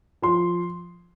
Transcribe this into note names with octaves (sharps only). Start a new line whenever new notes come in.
F3 C6